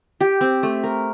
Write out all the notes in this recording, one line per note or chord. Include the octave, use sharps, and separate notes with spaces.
G4
C4
A3
A#4